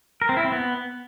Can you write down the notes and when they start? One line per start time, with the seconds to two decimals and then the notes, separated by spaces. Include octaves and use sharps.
0.22 A#4
0.29 C4
0.37 E4
0.44 C4
0.52 B3